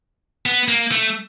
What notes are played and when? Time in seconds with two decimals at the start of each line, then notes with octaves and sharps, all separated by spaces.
0.46 B3
0.68 A#3
0.92 A3